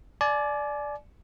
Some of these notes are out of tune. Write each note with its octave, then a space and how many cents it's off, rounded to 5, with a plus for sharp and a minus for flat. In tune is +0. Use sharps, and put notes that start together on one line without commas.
D5 +0 G#5 +40